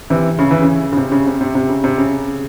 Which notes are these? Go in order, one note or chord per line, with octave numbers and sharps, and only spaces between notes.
C3 E3
C#3
E3
C#3
C#3
C3
C#3
C3
C3
C3
C#3
C3
C#3